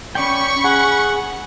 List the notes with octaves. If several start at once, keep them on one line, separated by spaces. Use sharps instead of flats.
C#4 D5 G5 B5 C#6
G#4 F#5